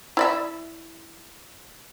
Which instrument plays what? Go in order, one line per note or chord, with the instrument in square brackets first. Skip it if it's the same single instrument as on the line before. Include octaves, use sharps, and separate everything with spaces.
[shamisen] E4 D5 E5